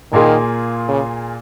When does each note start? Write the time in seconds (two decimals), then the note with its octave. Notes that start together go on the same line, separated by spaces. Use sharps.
0.12 A#2 D#3 A#3 F4 G#4
0.88 C#3